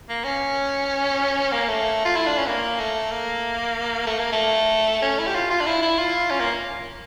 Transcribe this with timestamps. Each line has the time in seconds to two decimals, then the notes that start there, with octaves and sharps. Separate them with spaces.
0.09 A#3
0.24 C#4
1.52 A#3
1.68 A3
2.05 F4
2.16 E4
2.26 D4
2.37 C#4
2.47 A#3
2.80 A3
3.11 A#3
4.07 A3
4.19 A#3
4.32 A3
5.02 C#4
5.19 E4
5.27 G4
5.34 F4
5.50 F4
5.60 D4
5.66 E4
5.82 E4
5.98 F4
6.30 C#4
6.40 A#3